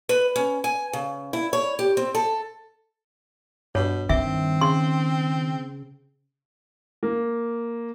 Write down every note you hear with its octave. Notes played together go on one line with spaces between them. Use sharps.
B4
C#4
G#5
C#3
E4
C#5
G4
C4
A4
G2 B2 C#5
D#3 C4 E5
C#3 C6
A#3